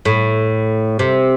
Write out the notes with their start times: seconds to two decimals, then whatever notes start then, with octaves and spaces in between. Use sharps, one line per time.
0.05 A2
0.99 C3